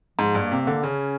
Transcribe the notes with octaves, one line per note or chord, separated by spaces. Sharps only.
G#2 F3
G2
A#3
C3
A#3
D3
C#3 C#4